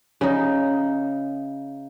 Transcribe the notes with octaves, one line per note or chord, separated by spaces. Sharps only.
C#3 D#4